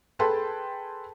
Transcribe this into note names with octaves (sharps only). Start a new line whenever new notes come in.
G#4 A4 B4 G5 A5 C6